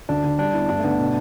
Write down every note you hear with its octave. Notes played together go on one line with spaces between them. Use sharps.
D2 D4
D3
G3 D4
B3 E4
G2 D4
A3
D3 B3
B2